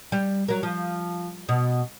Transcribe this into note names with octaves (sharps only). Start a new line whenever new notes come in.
G3
F#3 A#4
F3
B2